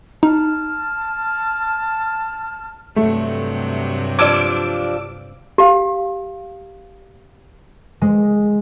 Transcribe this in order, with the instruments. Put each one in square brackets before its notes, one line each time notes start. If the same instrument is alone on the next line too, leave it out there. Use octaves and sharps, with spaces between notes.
[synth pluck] D#4 [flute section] A5 F6
[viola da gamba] G2 C3 F#3 [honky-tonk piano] A3
[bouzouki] F3 G3 D4 [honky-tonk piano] D5 G#6 [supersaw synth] D6 E6 D7
[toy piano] G4 F5
[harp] G#3